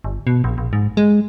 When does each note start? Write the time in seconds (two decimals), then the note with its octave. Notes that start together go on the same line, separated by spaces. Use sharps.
0.04 G1
0.27 B2
0.44 A#1
0.58 A#1
0.73 G#2
0.97 G#3